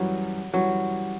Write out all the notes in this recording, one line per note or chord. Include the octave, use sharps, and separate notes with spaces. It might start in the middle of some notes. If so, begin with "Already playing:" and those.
Already playing: F#2 E3 F#3 G3
F#2 E3 F#3 G3